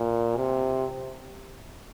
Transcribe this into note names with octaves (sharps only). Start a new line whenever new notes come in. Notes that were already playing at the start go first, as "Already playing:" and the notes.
Already playing: A#2
C3